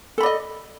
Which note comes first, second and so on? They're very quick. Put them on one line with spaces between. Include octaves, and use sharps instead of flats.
A4 B5 D5 D#5